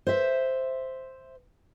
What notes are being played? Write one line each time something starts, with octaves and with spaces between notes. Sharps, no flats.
C5 E5